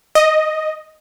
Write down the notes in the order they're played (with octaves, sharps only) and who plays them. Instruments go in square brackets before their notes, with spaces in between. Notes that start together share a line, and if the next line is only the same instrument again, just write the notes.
[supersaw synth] D#5